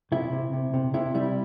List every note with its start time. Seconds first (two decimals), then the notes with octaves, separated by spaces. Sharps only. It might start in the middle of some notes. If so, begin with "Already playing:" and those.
0.12 C3 E4
0.33 C3
0.53 C3
0.74 C3
0.94 C3 E4
1.15 G3 E4